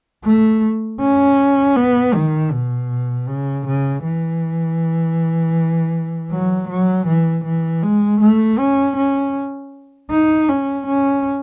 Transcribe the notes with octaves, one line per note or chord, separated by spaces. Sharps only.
A3
C#4
B3
D#3
B2
C#3
C#3
E3
F#3
F#3
E3
E3
G#3
A3
C#4
C#4
D#4
C#4
C#4